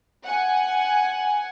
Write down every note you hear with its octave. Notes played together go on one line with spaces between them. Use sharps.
F#5 G#5